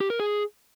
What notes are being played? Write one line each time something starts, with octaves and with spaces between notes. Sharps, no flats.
G4
A#4
G#4